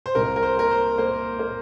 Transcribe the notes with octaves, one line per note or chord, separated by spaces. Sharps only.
C5
C2 A#4
A#4
C5
A#3 A#4
C5
A#3 C5
A#3